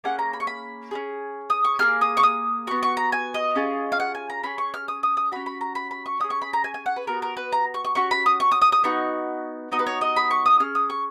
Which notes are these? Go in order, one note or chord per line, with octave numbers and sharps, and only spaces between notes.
A#3 C#4 G#4 F#5
A#5
B5
C#6
B5
C#4 F4 G#4
D#6
C#6
A#3 D#4 G#4 F6
D#6
C#6
D#6
B3 F#4 C#6
C#6
A#5
G#5
D#5
C#4 F4 G#4
F5
F#5
G#5
A#5
C#4 G#4 B5
C#6
F6
D#6
D#6
D#6
C#4 F#4 B5
B5
A#5
B5
B5
C#6
C#4 G#4 D#6
C#6
B5
A#5
G#5
G#5
F#5
B4
B3 F#4 A#4
A#4
B4
A#5
C#6
C#6
C#4 F#4 C#6
B5
D#6
C#6
D#6
D#6
D#6
B3 D#4 F#4 C#6
B3 D#4 F#4 D#5
B4
C#5
D#5
B5
C#6
D#6
C#4 G#4 F6
D#6
C#6